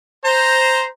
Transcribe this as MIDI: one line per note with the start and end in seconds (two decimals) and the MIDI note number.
0.25 0.86 72
0.25 0.87 82